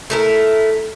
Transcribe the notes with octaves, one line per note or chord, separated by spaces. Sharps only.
A3 E4 A#4